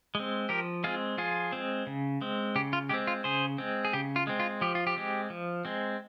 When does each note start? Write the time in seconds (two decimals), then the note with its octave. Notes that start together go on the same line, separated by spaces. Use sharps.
0.15 G#3 C4
0.49 F3 G4 A#4
0.84 G#3 C4 F4 G#4
1.18 F3 F4 G#4
1.52 G#3 C4
1.87 C#3
2.21 G#3 C4
2.56 C#3 G4
2.73 F4
2.89 G#3 C4 G4
3.07 F4
3.24 C#3 G#4 C5
3.58 G#3 C4
3.85 G#4
3.93 C#3 G4
4.16 F4
4.27 G#3 C4
4.40 F4
4.61 F3 G4
4.75 F4
4.87 G4
4.96 G#3 C4
5.30 F3
5.65 G#3 C4